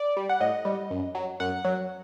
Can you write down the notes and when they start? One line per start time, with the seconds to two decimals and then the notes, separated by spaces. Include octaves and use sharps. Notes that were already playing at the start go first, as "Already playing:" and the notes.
Already playing: D5
0.17 G3
0.29 F#5
0.40 A2 D#5
0.65 G3
0.91 F#2
1.15 F#3
1.40 F#2 F#5
1.65 F#3